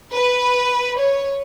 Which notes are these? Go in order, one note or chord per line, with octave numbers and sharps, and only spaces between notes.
B4
C#5